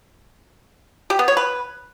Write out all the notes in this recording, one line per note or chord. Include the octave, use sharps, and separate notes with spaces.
G4
B3
C#5
B4